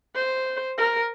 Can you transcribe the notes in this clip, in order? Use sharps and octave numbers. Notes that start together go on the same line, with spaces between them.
C5
A#4